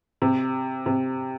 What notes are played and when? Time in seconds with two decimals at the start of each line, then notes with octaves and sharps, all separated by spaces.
0.22 C3
0.86 C3